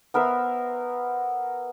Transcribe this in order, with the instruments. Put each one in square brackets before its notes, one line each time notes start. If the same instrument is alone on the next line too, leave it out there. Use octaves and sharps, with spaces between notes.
[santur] B3 A#4 C5 E5